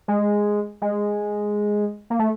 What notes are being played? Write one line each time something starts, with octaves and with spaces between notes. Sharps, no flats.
G#3
G#3
A#3
A3